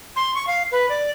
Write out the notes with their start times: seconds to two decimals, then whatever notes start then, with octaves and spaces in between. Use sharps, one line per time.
0.16 C6
0.35 C#6
0.47 F5
0.72 B4
0.89 D5